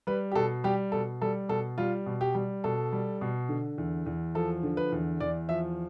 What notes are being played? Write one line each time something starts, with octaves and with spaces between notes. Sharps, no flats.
G3 B4
G4
B2 A4
G3 G4
B2 A4
G3 A4
B2 A4
G3 F4
B2
G4
G3
B2 A4
G3
B2
D3
E2
E2
F3 A4
D3
B4
E2
E2 D5
F3 E5